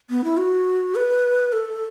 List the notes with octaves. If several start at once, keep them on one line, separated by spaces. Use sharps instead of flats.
B3
E4
F#4
B4
A4